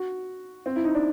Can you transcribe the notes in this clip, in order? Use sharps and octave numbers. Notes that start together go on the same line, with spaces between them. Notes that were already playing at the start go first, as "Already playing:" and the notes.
Already playing: F#4
C4
E4
D#4
D4